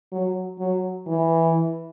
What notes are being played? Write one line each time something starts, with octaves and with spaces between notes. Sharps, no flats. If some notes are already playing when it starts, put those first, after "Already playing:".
F#3
F#3
E3